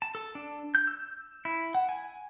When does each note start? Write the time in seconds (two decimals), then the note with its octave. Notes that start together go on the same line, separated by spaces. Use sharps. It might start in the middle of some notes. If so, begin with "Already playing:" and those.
0.02 A5
0.15 A4
0.35 D4
0.75 G6
0.87 E6
1.45 E4
1.75 F#5
1.89 G#5